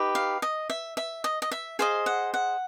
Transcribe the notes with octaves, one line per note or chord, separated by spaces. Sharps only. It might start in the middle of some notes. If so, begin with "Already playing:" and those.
Already playing: D#4 G4 B4
F5
D#5
E5
E5
D#5
D#5
E5
G#4 C5 D#5 F5
F#5
F#5